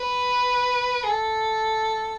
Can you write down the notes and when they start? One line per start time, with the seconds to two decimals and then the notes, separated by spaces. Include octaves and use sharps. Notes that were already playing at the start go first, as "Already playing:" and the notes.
Already playing: B4
1.04 G#4
1.09 A4